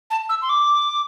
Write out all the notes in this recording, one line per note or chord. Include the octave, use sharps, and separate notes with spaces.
A5
E6
C6
D6